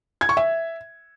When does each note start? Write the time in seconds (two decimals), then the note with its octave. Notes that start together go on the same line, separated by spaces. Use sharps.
0.21 G#6
0.29 C#6
0.37 E5